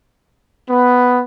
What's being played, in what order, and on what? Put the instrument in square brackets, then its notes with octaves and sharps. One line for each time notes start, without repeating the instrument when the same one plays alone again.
[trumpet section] B3